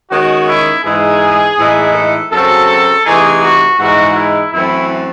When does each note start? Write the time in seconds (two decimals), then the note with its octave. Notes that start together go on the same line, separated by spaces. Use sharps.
0.11 D#3 G#3 C#4 F#4
0.48 E4
0.84 G#2 E3 G#3 D#4 G#4
1.58 A2 E3 G#3 D#4
1.95 A4
2.32 F#2 C#3 F#3 C4 A4
3.06 C3 E3 A3 D#4 G#4
3.42 F#4
3.79 G#2 E3 G#3 D#4 F#4
4.16 E4
4.53 F#2 E3 A3 C4 E4